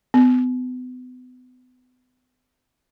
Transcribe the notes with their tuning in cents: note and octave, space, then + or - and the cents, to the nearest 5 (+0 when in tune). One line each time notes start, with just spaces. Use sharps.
B3 +35